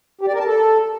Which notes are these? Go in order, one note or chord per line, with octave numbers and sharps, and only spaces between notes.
G4
D5
A#4
A5
A4